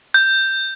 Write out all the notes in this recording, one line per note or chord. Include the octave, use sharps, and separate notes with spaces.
G6